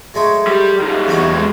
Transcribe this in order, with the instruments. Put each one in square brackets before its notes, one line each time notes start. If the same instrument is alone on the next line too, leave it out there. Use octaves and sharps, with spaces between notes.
[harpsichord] F#3 G#3 A3
[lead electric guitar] G3
D#3 G3
[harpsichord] E2 F#3 F#4
[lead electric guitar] D#2 G#3